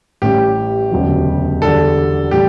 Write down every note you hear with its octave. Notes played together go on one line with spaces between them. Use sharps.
A1 A2 G3 G4
E1 D2 C#3 F#3
E2 D3 G3 D4 A4
A2 E3 G3 G4